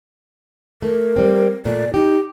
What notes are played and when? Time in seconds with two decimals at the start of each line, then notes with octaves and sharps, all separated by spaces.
0.82 A3 A#4
1.16 G3 C4
1.65 A#2 A3 D5
1.94 D#4 G4